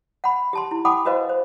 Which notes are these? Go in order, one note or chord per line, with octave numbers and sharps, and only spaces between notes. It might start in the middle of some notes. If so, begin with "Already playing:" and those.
F#5 B5
G4 A5 C6
E4
F#5 G5 A5 B5 D6 D#6
F#4 B4 C5 D#5 F5
C5